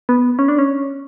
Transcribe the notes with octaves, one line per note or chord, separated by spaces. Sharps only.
B3
C#4
D4
C#4